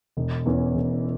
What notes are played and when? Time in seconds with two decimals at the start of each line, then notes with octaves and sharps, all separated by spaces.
0.17 E1
0.46 E2 E3 C#4 E4
0.75 E1